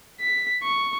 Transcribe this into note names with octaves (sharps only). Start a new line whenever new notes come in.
B6
C#6